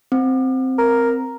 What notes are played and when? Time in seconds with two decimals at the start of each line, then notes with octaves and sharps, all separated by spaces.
0.12 C4
0.78 A#4